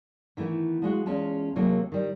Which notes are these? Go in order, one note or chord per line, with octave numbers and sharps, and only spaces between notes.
D#3 E3 A3 B3
F3 G#3 F#4
E2 G#3 C#4 F4 A5
D#2 C3 F#3 G#3 A#3 A4
D#3 G3